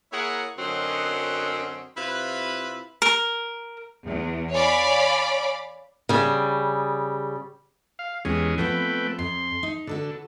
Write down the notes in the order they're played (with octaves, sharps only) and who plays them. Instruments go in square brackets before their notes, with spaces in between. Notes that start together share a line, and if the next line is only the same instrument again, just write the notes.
[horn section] A#3 E4 G#4 A#4 C#5 F#5
F#2 D3 F#3 C4 C#4 D#5
C3 E4 F4 B4
[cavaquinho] A#4
[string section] E2
C#5 D5 F5 G#5 B5 D6
[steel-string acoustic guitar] C#3 G3
[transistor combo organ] F5
[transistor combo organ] E2 G#3 C#4 [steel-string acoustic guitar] G4
[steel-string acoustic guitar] F3 B3 C4 [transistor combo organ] A3 B4 G5
[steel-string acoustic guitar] F2 [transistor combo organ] C6
[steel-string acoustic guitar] D#4
[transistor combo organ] D3 [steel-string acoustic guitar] F#4 A4 B4